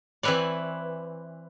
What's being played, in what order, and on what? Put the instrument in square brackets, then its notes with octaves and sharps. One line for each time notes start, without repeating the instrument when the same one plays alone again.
[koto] E3 C4 E4 B4 C#5 D5